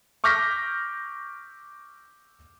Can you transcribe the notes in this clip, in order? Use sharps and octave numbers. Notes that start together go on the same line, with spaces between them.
C#6 D6 F6 G6 A#6 B6